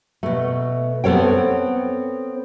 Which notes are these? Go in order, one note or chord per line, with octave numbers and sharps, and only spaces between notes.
B2 A3
B3 C4 A4 C#5 G5